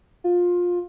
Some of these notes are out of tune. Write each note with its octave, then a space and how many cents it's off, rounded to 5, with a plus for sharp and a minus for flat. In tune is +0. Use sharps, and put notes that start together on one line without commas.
F4 +20